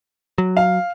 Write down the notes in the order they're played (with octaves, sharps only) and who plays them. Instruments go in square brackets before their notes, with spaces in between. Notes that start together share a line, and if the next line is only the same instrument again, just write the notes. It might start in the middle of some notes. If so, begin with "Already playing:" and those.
[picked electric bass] F#3
[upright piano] F5